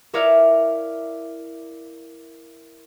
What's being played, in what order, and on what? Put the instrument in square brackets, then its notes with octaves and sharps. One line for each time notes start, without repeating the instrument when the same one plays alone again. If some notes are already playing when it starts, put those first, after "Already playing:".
[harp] E4 A#4 C#5 D5 E5 F5